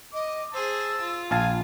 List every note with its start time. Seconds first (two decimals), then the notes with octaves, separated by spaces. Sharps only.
0.13 D#5 D6
0.54 G#4 C5 A5 E6
1.01 F4
1.31 A#1 F5 G#5 A5